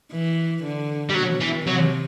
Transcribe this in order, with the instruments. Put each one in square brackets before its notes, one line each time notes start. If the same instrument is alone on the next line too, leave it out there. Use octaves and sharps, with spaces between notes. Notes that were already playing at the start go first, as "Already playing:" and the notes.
[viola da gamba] E3
D3
[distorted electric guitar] G3
[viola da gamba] B2 [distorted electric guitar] F#3
[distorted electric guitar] E3
[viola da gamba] C3 [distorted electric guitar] F#3